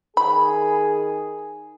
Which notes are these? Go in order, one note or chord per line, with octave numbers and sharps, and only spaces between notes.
D#3 G#4 B5